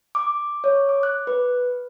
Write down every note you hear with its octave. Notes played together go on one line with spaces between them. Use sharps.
D6
C#5
D6
F#6
B4